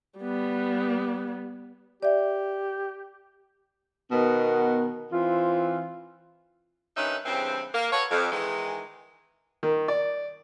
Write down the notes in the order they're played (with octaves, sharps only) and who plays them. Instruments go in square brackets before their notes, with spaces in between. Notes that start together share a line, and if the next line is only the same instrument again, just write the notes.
[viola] G3 B3
[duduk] G4 [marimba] D5 E5
[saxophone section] B2 D#3 B3
E3 C4 F4
G2 D#3 C#4 D#4 B4 E5
E2 G2 C#3 E3 C4
A#3
F#4 A4 B4 C#5
F2
D#3 E3 G#3
[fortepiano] D#3
D5